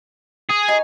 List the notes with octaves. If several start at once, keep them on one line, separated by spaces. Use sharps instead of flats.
G#4
D#4 C#5 G#5